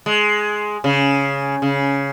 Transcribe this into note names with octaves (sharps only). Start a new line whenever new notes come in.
G#3
C#3
C#3